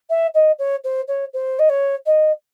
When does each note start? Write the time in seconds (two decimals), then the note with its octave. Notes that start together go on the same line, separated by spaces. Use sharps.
0.10 E5
0.35 D#5
0.59 C#5
0.84 C5
1.08 C#5
1.34 C5
1.59 D#5
1.70 C#5
2.06 D#5